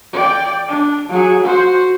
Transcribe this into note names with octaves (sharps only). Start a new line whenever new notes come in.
D5 G5
D4
F#3 G#4
F#4 C5